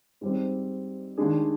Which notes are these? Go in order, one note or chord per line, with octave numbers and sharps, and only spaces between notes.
G#2 G3 C4
D#2 D#3 G#3 D4 G#4